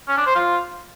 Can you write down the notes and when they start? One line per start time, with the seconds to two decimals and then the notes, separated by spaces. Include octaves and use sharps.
0.08 C#4
0.17 D4
0.26 C5
0.35 F4